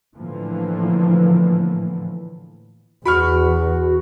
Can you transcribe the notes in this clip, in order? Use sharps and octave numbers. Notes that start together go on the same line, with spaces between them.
A2 D3 E3 F3 A#3
E2 F#4 B5 C#6 F6